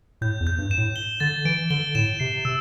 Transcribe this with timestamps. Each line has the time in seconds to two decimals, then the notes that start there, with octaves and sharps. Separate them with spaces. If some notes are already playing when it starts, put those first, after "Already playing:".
0.21 A2 G6
0.40 E2
0.47 G6
0.58 G2
0.71 E7
0.78 A2
0.96 G7
1.20 D3 A6
1.45 E3 D7
1.70 D3 G7
1.95 A2 E7
2.20 C3 C7
2.45 C3 E6